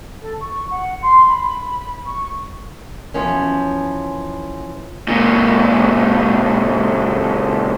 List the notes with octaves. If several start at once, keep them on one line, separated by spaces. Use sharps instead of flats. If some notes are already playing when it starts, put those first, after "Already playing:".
A4
C#6
F#5
C6
B5
C#6
F#2 E3 F3 B3 C#4
C#2 A#2